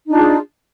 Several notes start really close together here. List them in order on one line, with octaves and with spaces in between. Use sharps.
D#4 D4 F4 G#4